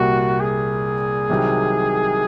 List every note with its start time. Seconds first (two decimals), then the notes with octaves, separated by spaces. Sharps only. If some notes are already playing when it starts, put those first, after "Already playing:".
Already playing: C2 A#2 G3 A#3 F#4
0.40 G#4
1.30 C2 C3 D#3 F#3